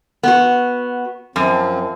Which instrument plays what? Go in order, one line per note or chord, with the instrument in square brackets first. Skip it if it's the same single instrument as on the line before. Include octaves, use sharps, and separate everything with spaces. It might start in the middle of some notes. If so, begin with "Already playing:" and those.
[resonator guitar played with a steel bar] B3 F#4
[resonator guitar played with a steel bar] F#2 [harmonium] F3 C4